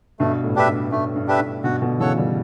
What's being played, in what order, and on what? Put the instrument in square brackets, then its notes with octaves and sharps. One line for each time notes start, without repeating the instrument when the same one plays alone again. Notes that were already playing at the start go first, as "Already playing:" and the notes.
[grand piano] G2 B2 [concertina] A3
[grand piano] A2
[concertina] D4 G4 B4 E5
[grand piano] G2
[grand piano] G2 [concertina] A3
[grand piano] G2
[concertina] D4 G4 B4 E5
[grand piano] G2
[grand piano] G2 B2 [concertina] F#4
[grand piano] B2 D3
[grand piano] C#3 E3 [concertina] A4 C#5 F#5
[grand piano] E3 G3